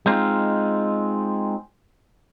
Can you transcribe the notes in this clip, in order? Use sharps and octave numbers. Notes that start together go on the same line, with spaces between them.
G#3 C4 D#4 F4